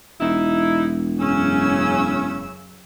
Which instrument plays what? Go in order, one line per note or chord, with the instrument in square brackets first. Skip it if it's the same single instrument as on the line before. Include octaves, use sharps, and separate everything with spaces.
[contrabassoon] E1 [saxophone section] D#4 E4
[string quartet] F#2 C#3 E6 [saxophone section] C#4